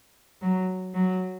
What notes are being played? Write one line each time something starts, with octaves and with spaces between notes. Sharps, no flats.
F#3
F#3